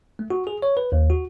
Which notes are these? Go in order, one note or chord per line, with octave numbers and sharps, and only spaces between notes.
A3
F#4
G#4
C#5
B4
D#2
F#4